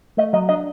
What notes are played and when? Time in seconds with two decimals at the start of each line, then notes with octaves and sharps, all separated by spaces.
0.17 A3 D#5
0.33 F#3 D#5
0.49 D4 D#5